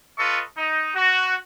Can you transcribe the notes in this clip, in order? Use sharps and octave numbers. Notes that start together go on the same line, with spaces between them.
F4 A4 B4 D#5 C#6
D#4
F#4